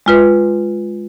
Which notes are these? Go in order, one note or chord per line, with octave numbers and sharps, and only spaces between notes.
G#3 F4 B4